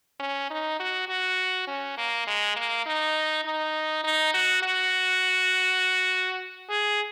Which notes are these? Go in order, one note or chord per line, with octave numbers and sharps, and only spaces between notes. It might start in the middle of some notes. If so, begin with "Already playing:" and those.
C#4
D#4
F#4
F#4
C#4
A#3
G#3
A#3
D#4
D#4
D#4
F#4
F#4
G#4